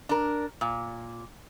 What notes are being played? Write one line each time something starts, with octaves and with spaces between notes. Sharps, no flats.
D4 A#4
A#2